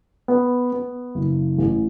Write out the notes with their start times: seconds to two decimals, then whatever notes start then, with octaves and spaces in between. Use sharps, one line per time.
0.28 B3
0.73 B3
1.15 F#1
1.58 A1